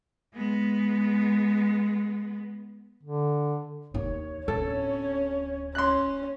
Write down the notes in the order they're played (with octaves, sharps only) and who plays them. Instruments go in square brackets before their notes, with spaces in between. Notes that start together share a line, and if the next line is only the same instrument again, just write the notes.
[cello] G#3 B3
[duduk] D3
[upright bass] D#2 D#3 [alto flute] C#5
[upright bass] D1 [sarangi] C#4 [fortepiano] A4
[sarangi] C#4 [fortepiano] C6 F#6